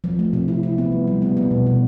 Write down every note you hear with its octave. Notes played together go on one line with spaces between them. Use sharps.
F3
A3
C3
E4
E4
B3
G3
G3
B3
B3
B2
B2